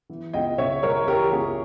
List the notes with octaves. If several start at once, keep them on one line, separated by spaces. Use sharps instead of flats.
E3
C#2 D#5 G5
C#3 C#5 E5
G#3 A#4 C#5
E3 G4 A#4
C#2 G#4